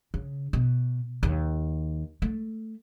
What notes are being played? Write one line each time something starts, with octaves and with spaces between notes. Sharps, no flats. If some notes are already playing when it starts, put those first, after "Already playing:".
C#3
B2
D#2
A3